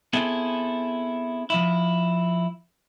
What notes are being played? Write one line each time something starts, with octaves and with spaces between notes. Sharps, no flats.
B3 C4 E4 G#4 A4
F3 E4